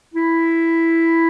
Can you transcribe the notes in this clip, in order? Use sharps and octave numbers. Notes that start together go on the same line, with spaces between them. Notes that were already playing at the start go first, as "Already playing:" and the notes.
E4